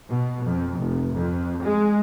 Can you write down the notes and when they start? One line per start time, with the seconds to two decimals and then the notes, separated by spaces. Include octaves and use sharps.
0.10 B2
0.45 F2
0.79 F1
1.14 F2
1.63 G#3